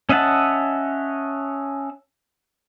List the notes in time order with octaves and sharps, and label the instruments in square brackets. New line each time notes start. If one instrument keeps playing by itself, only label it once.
[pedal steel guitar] C#4 D#5 E5 F#5 A5